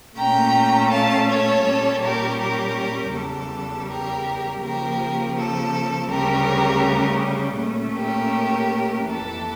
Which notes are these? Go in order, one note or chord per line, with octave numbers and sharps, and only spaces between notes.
A#2 A3 C#4 G5 A#5
F5 A5
A4 C#5
A#2 G3 C#4
G4 A#4
G4 A#4
E2 C#3 G3 A4
G4 A#4
C#3 F3 A#3 G4 A#4
A4
D2 C#3 G3 C#4 G4 A#4
A#2 A3 C#4
G4 A#4
F2 E3 A#3 A4